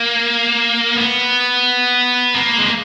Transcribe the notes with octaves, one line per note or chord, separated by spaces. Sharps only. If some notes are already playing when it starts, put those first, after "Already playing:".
Already playing: A#3
B3
A#3
G#3